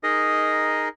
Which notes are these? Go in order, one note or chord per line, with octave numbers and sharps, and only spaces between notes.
D#4 G#4 A#4 D#5